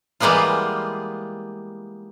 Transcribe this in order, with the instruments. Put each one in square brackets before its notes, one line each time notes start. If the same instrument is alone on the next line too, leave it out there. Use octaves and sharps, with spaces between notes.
[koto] E3 G3 G#3 A#3 B3 F4